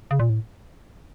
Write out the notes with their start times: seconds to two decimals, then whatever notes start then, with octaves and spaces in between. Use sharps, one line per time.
0.11 C#3
0.20 A#2
0.30 A2